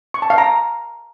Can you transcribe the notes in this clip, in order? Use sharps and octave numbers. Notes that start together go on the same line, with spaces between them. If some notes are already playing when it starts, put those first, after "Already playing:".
C#6
A5
F5
A#5